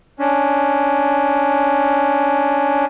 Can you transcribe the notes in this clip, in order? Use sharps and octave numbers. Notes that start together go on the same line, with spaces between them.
C#4 D4